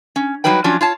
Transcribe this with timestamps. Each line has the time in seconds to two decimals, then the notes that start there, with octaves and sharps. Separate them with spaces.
0.16 C#4
0.44 F#3 G3 D#4 B4 G5
0.64 F3 F#3 C#4 D4 F4
0.81 F4 C#5 A5